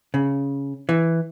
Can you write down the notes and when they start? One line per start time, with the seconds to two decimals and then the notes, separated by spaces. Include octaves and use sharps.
0.14 C#3
0.89 E3